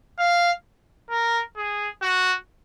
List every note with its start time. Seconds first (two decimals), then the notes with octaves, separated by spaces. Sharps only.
0.19 F5
1.11 A#4
1.57 G#4
2.02 F#4